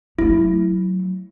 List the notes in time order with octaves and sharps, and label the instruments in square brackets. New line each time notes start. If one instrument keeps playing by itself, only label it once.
[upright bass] F#3 A3 [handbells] E4